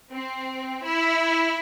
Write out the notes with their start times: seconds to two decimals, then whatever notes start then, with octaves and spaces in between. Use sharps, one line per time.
0.13 C4
0.84 E4